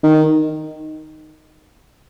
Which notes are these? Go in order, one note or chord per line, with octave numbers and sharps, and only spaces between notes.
D#3